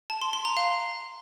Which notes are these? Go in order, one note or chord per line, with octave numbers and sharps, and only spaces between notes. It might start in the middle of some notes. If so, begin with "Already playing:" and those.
A5
C6
C6
A#5
F5